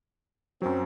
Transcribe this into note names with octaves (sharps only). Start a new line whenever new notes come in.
F#2 F#3 C4